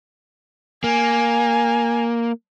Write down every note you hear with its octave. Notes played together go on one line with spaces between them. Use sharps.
A#3 G#5